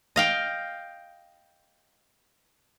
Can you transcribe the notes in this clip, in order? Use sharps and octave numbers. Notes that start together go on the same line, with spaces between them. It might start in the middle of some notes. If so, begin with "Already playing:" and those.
D#5 F5 G5